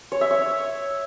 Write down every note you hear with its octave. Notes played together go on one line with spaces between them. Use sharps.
C#5
E5
C#5